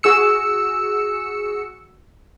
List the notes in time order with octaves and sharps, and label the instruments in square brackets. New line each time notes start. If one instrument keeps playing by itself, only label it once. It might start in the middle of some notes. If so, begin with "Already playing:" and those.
[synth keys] F#4 G#4 E6 C#7